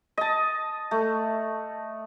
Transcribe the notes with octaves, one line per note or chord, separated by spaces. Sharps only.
D#5 A5
A3